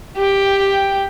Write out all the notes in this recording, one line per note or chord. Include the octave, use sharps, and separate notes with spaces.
G4 G5